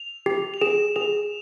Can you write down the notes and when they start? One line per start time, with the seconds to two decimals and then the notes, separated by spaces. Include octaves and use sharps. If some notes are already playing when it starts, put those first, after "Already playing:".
Already playing: F7
0.26 G4
0.54 F7
0.61 G#4 E7
0.96 G#4 F7